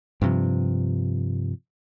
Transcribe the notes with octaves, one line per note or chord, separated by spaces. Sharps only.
G2 C3 F3